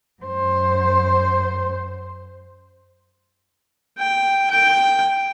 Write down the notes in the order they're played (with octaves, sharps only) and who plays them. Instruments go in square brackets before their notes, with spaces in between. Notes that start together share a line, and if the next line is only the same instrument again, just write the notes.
[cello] F#2 C5
[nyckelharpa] G5
G5